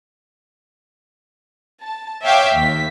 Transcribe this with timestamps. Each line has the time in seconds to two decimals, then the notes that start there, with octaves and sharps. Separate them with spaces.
1.82 A5
2.24 C#5 E5 F5 G5 D6
2.54 D#2 B6